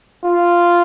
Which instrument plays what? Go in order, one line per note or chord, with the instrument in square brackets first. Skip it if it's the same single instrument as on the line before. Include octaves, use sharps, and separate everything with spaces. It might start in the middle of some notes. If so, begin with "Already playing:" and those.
[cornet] F4